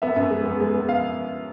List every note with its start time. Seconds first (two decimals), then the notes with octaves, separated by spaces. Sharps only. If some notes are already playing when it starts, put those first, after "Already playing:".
0.02 B3 E5
0.16 F#2
0.30 G#3
0.45 B3
0.60 G#3
0.74 B3
0.89 F5